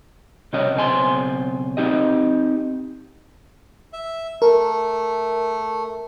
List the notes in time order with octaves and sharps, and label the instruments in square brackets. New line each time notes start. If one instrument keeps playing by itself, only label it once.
[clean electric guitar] C3 G3 C#4 D#5
B1 C#3 C4 D4 G#5 C6
C4 D#4 G4 D#5
[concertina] E5
[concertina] A3 [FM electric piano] A#4